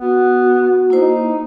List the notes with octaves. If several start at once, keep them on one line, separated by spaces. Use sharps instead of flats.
B3 F#4
A#3 D#4 E4 C5